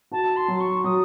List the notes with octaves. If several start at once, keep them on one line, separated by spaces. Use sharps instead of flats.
F#4 A5
C6
F#3
C#6
F#3 D#6